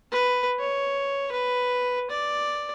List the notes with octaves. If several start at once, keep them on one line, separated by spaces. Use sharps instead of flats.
B4
C#5
B4
D5